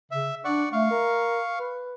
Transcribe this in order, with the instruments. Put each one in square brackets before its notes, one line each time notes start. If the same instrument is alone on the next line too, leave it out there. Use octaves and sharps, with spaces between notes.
[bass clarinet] C#3 [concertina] E5
[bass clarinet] D4 [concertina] D5 F#5 C#6
[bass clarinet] A3 [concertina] F5 C#6
[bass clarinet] A#4
B4